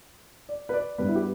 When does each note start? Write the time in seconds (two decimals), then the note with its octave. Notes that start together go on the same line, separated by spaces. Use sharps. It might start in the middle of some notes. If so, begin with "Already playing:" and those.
0.49 D5
0.69 B4
0.74 D5
0.98 G2 G3 B3 B4
1.08 E4
1.15 G4